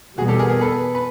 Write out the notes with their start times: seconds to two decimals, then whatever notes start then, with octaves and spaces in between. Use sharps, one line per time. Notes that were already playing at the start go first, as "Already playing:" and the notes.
0.18 E2 B2 G3 B3 F#4 G#4
0.28 G4 A4
0.39 G#4 A#4
0.50 G#4 A#4
0.61 A4 B4
0.95 B4